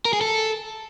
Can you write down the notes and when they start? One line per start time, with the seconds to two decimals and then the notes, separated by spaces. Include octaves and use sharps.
0.05 A#4
0.13 G#4
0.21 A4